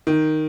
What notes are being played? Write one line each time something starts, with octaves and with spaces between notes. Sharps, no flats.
D#3